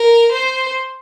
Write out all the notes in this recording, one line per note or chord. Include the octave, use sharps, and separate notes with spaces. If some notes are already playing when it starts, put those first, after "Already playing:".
Already playing: A#4
C5